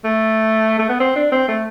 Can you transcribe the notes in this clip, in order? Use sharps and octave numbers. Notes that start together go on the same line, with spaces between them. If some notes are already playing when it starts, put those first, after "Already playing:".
A3
A3
B3
C4
D4
C4
A3